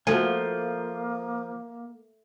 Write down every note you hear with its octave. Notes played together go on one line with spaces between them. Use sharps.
F3 A3 A#3 F#4 G#5